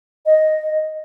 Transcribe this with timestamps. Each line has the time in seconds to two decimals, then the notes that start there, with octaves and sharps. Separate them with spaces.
0.26 D#5